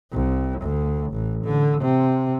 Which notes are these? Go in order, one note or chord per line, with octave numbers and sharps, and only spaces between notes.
C2
D2
A1
D3
C3